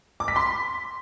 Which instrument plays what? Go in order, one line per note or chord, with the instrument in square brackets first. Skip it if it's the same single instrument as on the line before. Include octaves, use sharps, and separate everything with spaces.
[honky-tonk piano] D6
B6
C6